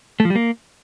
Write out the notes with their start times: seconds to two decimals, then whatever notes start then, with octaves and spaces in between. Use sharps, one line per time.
0.20 A3
0.25 F3
0.30 G3
0.35 A#3